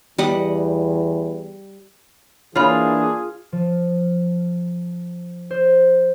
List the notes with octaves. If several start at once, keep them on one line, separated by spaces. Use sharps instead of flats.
E2 G3 D#5 F#5
E3 A#3 D4 F4 G#4 C#5 B5
F3
C5